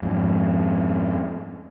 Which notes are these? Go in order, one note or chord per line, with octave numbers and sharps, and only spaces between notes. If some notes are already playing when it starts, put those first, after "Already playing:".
F2 G#2